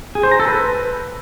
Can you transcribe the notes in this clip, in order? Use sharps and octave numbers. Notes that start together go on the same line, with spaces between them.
G#4
C5
A#5
A4
B4